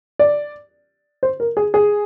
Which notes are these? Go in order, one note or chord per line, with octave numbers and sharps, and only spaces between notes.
D5
C5
A#4
G#4
G#4